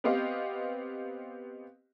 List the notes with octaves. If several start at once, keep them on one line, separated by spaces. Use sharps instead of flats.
B3 C4 G4 D#5 F5